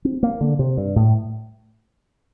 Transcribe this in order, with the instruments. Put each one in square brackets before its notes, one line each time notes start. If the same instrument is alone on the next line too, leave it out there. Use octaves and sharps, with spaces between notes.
[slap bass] C4
A#3
D3
C3
G2
A2